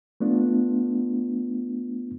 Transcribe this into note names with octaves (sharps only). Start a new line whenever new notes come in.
A3 B3 D4 F4